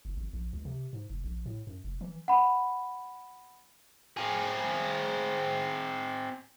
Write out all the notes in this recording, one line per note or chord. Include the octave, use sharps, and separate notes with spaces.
F#1
G#1
A#1
C#2
C3
G#2
F1
A#1
A2
F#2
F1
E3
F#5 B5
C4 G#4